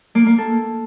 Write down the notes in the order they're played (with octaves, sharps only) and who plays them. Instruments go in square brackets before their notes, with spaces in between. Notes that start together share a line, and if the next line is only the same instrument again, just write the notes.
[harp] A#3
A#3
A4